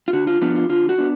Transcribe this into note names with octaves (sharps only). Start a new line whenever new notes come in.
F4
D3 F#4
F4
F3 B3 D4 F4
F4
D3 F4
F#4
B3 D4